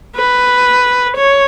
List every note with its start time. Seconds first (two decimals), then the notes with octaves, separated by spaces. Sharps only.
0.17 B4
1.17 C#5